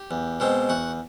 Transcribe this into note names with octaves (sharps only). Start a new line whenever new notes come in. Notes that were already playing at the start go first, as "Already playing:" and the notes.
Already playing: G4
E2
B2 G#3 C4
E2 F#4